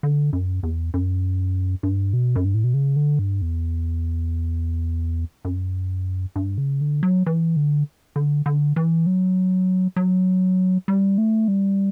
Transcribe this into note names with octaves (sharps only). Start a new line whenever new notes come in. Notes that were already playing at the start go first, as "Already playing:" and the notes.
D3
F#2
E2
F#2
G2
B2
F#2
G2
A2
B2
C#3
D3
G2
E2
F#2
G2
C#3
D3
F#3
E3
D3
D3
D3
E3
F#3
F#3
G3
A3
G3